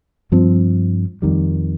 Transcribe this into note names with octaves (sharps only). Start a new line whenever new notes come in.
G2 F3 C4
F2 D#3 G3